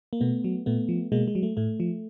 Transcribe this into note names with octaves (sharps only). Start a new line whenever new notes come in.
A#3
B2 A3 B3
F#3
A#2 A3 B3
F3
B2 G#3 A#3
G#3
F#3
A3
A2 A3
F3